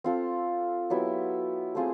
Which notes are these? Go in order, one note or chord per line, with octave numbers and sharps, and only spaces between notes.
C4 F4 A4
F#3 B3 E4 G4
A3 C4 F4 G#4